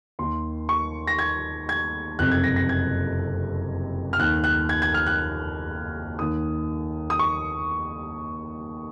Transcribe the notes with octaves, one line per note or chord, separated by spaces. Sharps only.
D#2 D#3 C6
C#6
A#6
G#6
G#6
F#1 F2 C3 F#6
G#6
A#6
A#6
G#6
F6
D#2 D#3 F#6
F#6
G#6
G#6
F6
F#6
D#2 D#3 D#6
D#6
C#6